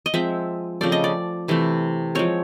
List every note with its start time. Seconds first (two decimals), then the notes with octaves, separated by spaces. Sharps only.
0.06 D#5
0.14 F3 G#3 C4 E5
0.81 C#3 F3 A3 C4 D5
0.92 D#5
1.04 D5
1.48 C3 E3 A3
2.15 F3 G#3 C4 C#5